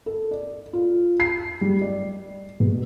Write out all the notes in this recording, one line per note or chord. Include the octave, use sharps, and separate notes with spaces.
A4
D5
F4
C7
G3
D5
B2